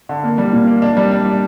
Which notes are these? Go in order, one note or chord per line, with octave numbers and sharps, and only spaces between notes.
D3
A#3
G3
A#2
A#3
D4
G3
D4
G3